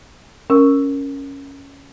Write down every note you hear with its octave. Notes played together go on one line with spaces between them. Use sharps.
C#4 A#4 E6